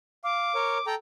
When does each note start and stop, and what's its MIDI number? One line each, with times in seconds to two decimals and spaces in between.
0.24 0.52 77
0.24 0.86 86
0.55 0.78 70
0.55 0.78 73
0.87 0.95 69
0.87 0.95 79
0.87 0.95 82